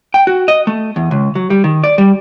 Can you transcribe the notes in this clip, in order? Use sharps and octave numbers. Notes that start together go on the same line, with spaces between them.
G5
F#4
D#5
A3
E2
C#2
F#3
G3
D#3
D5
G3